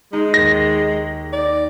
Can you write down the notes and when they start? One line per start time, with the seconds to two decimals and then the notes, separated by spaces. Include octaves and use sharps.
0.13 G#3 D#4
0.34 D#2 A6 A#6
1.33 D#4 D5